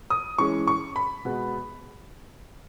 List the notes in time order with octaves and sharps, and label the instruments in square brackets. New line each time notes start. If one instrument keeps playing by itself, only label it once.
[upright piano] D#6
E3 G#3 C#4 C#6
C#6
B5
B2 G#3 B3